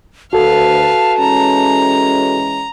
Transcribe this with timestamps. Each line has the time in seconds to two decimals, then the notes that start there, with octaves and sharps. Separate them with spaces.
0.33 D2 F#4 A4 B4 F5 A5
1.19 E3 G#3 C#4 A#5